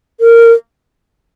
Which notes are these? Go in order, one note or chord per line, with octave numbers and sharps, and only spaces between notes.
A#4